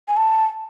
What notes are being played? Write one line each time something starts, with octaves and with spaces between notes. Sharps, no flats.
G#5
A5